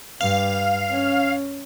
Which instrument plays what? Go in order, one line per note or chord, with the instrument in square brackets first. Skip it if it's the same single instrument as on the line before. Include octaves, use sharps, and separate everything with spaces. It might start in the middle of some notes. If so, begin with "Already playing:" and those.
[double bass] G2 [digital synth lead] F5
[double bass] C#4